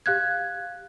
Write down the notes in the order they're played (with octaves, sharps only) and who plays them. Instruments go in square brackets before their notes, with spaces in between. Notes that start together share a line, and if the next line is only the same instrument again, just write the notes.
[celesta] G4 F5 F#6 G#6